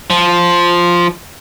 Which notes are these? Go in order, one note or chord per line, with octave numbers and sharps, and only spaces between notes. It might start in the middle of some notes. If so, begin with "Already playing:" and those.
F3